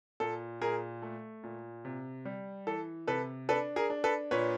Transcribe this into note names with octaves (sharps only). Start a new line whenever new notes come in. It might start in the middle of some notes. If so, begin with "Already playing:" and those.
A#2 A4
A#2 G#4 A#4
A3
A#2
C3
G3
E3 A4
C3 A4 B4
D4 A4 B4
G#4 A#4
D4
A4 B4
A#2 B4 C#5